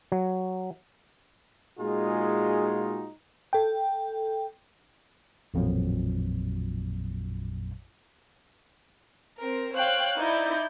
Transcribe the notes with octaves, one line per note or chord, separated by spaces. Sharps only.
F#3
A#2 G#3 D#4 F4 F#4 G#4
A4 G5
A1 F2 A#2 F#3
C4 A#4
C5 C#5 F5 G5 F#6
D#4 E4 D5 G6